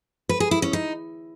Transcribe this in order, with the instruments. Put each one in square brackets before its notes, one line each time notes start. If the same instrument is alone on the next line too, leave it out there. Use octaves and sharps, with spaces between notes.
[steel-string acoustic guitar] B4
G#4
E4
C#4
D#4